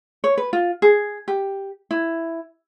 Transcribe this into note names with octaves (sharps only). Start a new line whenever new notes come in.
C#5
B4
F4
G#4
G4
E4